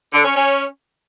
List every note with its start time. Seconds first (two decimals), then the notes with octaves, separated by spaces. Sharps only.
0.13 D3
0.25 C#4
0.36 C#4